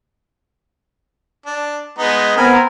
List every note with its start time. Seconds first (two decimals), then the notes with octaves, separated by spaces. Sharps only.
1.46 D4
1.99 G#3 B3 D#4
2.37 B3 C4 A#4 G#5 B5